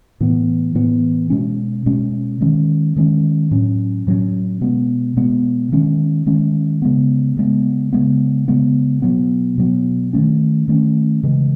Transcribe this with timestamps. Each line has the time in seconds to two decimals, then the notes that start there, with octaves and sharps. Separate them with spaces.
0.20 A2 E3 B3
0.75 A2 E3 B3
1.30 B2 G#3 C#4
1.86 B2 G#3 C#4
2.41 D#3 G#3 C#4
2.96 D#3 G#3 C#4
3.51 A2 F#3 C#4
4.07 A2 F#3 C#4
4.61 B2 G#3 B3
5.17 B2 G#3 B3
5.72 D#3 G#3 C#4
6.26 D#3 G#3 C#4
6.82 C#3 G#3 B3
7.37 C#3 G#3 B3
7.93 C#3 G#3 B3
8.48 C#3 G#3 B3
9.02 B2 F#3 B3
9.58 B2 F#3 B3
10.13 D#3 A3 C#4
10.68 D#3 A3 C#4
11.23 C#3 E3 G#3